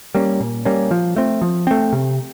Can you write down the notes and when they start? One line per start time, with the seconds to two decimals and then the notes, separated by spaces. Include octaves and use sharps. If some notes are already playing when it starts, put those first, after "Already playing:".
0.15 G3 A#3 C#4
0.40 A#2
0.65 G3 A#3 C#4
0.91 F3
1.16 A3 C4
1.42 F3
1.67 A3 C4
1.93 C3